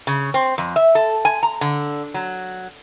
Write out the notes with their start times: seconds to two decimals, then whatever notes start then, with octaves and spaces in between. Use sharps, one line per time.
0.07 C#3
0.34 C4
0.58 F2
0.76 E5
0.95 A4
1.25 G#5
1.43 A#5
1.61 D3
2.14 F#3